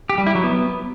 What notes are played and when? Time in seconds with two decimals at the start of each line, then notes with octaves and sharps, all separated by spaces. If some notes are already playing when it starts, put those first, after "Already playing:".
0.10 G4
0.18 G3
0.27 E4
0.35 F#3
0.44 B3